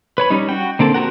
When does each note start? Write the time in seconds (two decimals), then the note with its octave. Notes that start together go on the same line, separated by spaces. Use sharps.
0.18 B4 C#5 B5
0.30 G3 C#4 D#4
0.49 F#4 F#5 G5
0.79 D3 A#3 C4 A4
0.94 C4 F#4 G4 A#4 F#5